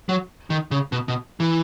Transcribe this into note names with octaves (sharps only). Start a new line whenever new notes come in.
F#3
D#3
C#3
B2
B2
E3